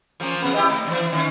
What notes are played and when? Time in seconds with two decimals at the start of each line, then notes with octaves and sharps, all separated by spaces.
0.20 F3 A#3 C#4
0.42 F2 C#3 B3
0.54 E4 G4 D#5
0.70 A3
0.87 D3 E3
1.12 D#3 C#4